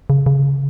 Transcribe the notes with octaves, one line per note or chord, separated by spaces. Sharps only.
C#3
C#3